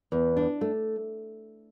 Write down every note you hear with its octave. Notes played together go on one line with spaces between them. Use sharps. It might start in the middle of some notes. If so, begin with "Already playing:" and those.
E2
D4
A3